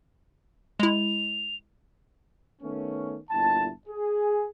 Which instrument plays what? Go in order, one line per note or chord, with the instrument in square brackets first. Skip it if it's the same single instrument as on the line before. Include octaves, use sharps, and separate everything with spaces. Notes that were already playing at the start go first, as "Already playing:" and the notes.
[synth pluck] G#3 E4 [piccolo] F7
[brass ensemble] D#3 A3 B3 C#4
G1 A#2 E4 A5
G#4